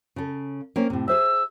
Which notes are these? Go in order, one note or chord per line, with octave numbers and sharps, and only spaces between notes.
C#3 A4
A#3 C4 C#4
A2 C3
G#4 C5 E5 E6